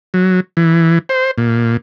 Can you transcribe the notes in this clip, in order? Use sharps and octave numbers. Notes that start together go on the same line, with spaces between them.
F#3
E3
C5
A#2